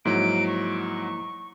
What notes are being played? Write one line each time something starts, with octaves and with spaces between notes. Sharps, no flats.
G#2 F3 F#3 A#3 E4 D7
C#6